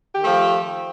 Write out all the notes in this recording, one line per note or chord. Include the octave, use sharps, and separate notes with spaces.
D#3 F3 A3 G4